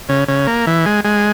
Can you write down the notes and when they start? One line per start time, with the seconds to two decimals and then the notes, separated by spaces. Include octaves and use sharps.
0.09 C#3
0.28 C#3
0.47 A#3
0.67 E3
0.86 G#3
1.04 G#3